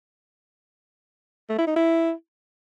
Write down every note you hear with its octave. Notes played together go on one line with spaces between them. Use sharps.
A3
E4
D#4
E4